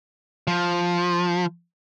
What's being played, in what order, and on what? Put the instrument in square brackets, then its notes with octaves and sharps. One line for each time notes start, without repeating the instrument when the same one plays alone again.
[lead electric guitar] F3